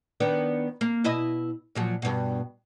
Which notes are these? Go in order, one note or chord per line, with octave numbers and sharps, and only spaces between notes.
D#3 B3 D4
A#3
B2 E4 D#5
A#2 F3 F#3
G2 B2